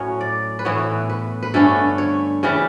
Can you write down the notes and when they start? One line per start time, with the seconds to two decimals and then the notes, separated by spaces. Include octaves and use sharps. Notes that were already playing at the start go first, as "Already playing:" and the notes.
Already playing: A2 F#3 C#4 C#5
0.21 D5
0.59 B4
0.65 A2 E3 B3 C#5
1.09 B4
1.43 B4
1.54 G2 D3 A3 C#4 A4
1.98 C#5
2.43 C#3 E3 G3